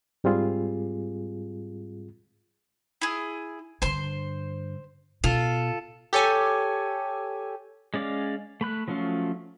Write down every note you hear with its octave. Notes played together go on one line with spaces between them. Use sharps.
G#2 G3 C4 F4 G#4
E4 G#4
G2 D3 C5 C6
B2 F4 A4
G4 A4 C#5 G#5
G#3 C#4 D5 F5
A3 B5 F#6
F3 F#3 A3 C#4 F4